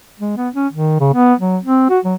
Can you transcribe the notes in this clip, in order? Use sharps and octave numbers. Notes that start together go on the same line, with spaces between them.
G#3
B3
C#4
D#3
C#3
B3
F#3
C4
F#4
F#3